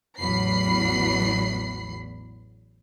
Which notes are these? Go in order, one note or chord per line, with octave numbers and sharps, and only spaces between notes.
A1 E2 F#3 B5 C7